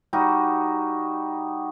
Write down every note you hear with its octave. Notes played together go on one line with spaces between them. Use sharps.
G3 D#4 F#4